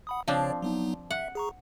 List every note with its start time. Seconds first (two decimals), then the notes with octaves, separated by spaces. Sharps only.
0.07 F#5 B5 D#6
0.28 C#3 F3 C4 D4 C#5 D5
0.62 F#3 B3 D#4
1.11 E5 F#5
1.35 G#4 A#5 C#6